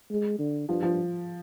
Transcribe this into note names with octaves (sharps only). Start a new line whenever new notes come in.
G#3
D3
G2 F3
F3